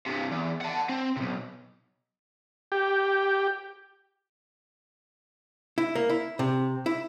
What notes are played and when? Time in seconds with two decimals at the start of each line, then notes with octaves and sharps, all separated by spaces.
0.06 G2 C3
0.31 E2
0.61 F#5 A5
0.89 C4
1.17 B1 C3
2.72 G4
5.78 E4
5.95 A#3
6.09 E4
6.39 C3
6.86 E4